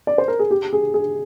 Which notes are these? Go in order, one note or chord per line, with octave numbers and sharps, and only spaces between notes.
D5
C5
A#4
G#4
G4
G#4
G#4